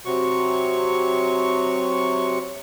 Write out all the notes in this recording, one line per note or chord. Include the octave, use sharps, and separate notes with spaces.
C3 F#3 C#6